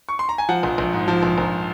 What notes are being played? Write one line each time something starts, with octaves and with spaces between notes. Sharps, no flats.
C#6
C6
A#5
G#5
F3 F#5
A#1
A#1
G#2
F3
A#1
A#1